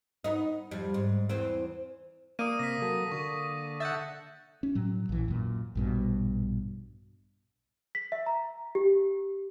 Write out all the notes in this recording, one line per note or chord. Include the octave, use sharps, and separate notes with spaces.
B3 D#4
F2 G3
G#2
E2 E3 C4
A#3 D5 D#6 D#7
C3 A#6 B6
F#3 A4 A#4
D3 A4 C#6
E5 F#5 G6 A6
C#4
A2 F#3
A#1 E3
F#2 A#2
A#1 G2 B2
B6
E5
A#5
G4